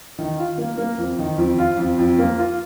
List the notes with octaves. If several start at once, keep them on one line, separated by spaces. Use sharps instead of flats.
D#3
F4
A#3
A#3
F2
D#3
F2
F4
F2
F2
A#3
F4